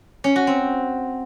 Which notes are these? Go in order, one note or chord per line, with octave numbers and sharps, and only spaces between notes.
C#4
F#4
C4